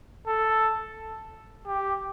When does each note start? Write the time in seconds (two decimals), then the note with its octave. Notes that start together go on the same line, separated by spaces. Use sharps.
0.27 A4
1.67 G4